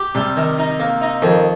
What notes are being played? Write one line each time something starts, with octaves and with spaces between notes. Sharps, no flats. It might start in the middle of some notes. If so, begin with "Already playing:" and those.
Already playing: G4
C3 G3
D#3
D#4
A#3
D#4
F2 D#3